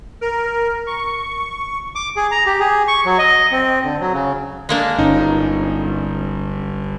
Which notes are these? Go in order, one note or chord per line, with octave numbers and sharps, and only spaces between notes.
A#4
C#6
D6
G#4
A#5
G4
G#4
C#6
F#3
D#5
C4
D3
F#3
C#3
G#3 A#3 D4
G1 C#4 D#4